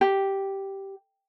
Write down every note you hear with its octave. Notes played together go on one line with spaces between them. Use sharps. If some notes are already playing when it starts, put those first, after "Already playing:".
G4